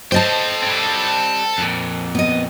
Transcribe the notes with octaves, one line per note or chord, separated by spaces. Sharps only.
A4 C5 D#5 G5 A5
G3 C4
F2 A#2
B3 D#5